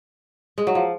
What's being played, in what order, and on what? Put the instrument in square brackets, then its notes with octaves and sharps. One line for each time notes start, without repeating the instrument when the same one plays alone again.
[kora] G#3
F#3
F3